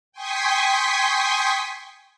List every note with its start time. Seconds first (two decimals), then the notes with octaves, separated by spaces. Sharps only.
0.12 G5 G#5 C6 C#6 D#6 B6